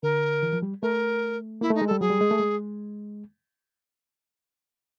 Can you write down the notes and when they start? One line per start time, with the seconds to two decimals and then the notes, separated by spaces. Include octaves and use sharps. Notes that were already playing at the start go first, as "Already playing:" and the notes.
0.03 D3 A#4
0.43 E3
0.53 F3
0.62 G3
0.82 A3 A#4
1.61 A#3 E4
1.71 A3 D#4
1.81 G#3
1.87 G3 A4
2.00 F#3 G#4
2.10 G3
2.21 G#3
2.31 A3
2.40 G#3